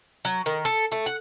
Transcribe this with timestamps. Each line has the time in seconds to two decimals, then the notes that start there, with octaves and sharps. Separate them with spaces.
0.25 F#3
0.46 D#3
0.65 A4
0.92 A3
1.06 F#5